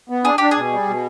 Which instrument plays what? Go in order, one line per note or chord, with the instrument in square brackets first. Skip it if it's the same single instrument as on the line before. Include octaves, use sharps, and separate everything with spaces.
[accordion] B3
[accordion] D4 [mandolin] G#4
[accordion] D4 [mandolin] G4
[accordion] B2 [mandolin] G#4
[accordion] G3
B2